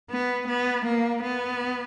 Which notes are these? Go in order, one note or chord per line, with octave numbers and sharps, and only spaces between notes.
B3
B3
A#3
B3